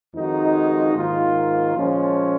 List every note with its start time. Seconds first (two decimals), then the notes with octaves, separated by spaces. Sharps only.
0.12 F2 D#3 G#3 D#4 F#4
0.94 G#2 D#3 A#3 F4
1.75 A#2 F3 G#3 C#4